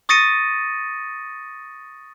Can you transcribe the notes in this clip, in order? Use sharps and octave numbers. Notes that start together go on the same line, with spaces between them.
C#6 D#6 A6 A#6 C#7 D#7